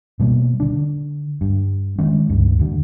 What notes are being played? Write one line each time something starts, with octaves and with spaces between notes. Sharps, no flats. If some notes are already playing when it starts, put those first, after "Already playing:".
B2 G3 A#3
D3 D4
G2
D#3 G#3 C#4
C#2 G2
D#2 D3